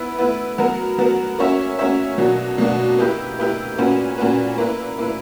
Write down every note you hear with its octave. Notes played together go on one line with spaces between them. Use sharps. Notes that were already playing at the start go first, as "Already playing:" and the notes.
Already playing: B3 E4 B4
B3 E4 B4
F#3 B3 F#4 A#4
F#3 B3 F#4 A#4
A#3 C#4 F#4 C#5 E5
A#3 C#4 F#4 C#5 E5
B2 F#3 A#3 D4 F#4
B2 F#3 A#3 D4 F#4
A#3 E4 G4 B4
A#3 E4 G4 B4
A#2 A#3 C#4 F#4 B4
A#2 A#3 C#4 F#4 B4
A#3 E4 B4
A#3 E4 B4